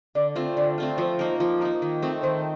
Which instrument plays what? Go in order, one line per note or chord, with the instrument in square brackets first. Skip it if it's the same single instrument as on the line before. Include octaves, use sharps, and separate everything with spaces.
[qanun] D3 [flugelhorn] D5
[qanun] A3 C4 F4
[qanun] D3 [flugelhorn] D5
[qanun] A3 C4 F4
[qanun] F3 [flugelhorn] C5
[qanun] A#3 D#4 A#4
F3
A#3 D#4 A#4
D#3
A3 C4 D#4
[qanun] D#3 [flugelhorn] C5